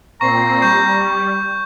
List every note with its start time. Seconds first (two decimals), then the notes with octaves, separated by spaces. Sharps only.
0.21 A#2 C4 A#5 C#6 C7
0.62 G3 C#6 G6